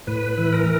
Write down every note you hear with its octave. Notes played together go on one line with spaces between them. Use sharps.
A2 B4
E3
A#4